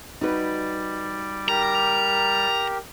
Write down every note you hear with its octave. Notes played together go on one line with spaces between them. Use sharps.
G3 D#4 F#4 B4 D5
G4 A#4 A#5